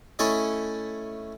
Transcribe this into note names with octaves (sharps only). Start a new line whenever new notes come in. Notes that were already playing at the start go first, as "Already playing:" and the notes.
A3 C#4 E4 A4 C#5 D#5